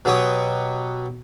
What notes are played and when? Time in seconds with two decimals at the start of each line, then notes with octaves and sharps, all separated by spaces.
0.05 B2 F#3 G4 C#5 D#6